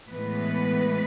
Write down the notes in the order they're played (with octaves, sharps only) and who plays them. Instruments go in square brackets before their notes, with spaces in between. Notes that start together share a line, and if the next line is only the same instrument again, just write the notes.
[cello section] A2 E3 G#3 B3 B4